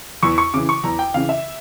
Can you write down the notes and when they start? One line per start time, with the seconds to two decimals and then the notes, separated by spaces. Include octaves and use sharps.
0.23 E2 C#6
0.38 C#6
0.54 C#3 E3 D6
0.69 C#6
0.84 E2 A#5
0.99 G5
1.14 C#3 E3 F5
1.29 E5